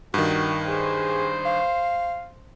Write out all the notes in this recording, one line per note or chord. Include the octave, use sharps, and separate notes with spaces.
G2 D#3 F#4
G#4 C5
F5